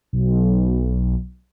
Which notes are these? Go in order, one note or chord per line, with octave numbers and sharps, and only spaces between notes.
B1